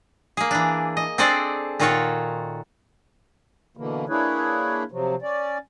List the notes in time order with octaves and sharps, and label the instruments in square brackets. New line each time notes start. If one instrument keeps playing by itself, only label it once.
[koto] A#3 G#4
E3 D4
D#5
C4 D4 G#4 A4 C5 D5
A#2 D#3 F4 F#4 A4 C#5
[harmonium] B2 D3 E3 A#3
A#3 D4 E4 G#4 B4 C#5
C3 F3 F#3
C#4 D5